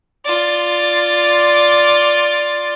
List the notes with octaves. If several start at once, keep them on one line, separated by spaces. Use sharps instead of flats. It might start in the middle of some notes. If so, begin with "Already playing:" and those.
F4 D5